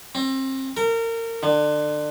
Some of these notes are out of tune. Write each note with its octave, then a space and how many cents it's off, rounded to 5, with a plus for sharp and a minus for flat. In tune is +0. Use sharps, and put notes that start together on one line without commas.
C4 +30
A#4 -30
D3 +30